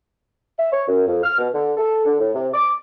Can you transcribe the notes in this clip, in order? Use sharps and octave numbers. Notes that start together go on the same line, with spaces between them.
E5
C#5
F#2
F2
F6
B2
D3
A4
D3
A2
C3
D6